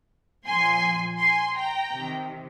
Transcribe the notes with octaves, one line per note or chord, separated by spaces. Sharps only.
A#2 F3 G#5 C6
G#5 C6
G5 A#5
C3 D#3